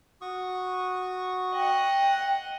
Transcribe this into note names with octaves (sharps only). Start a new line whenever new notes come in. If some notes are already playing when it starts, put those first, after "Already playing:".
F#4 C#6 D#6
D#5 F#5 G5